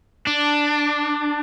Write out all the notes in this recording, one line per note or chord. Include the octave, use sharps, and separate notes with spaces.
D4